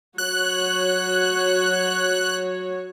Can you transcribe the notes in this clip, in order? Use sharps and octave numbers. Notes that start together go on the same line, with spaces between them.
F#3 F#4 C#5 F#6